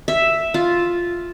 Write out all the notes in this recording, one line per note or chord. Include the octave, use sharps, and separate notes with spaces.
E5
F4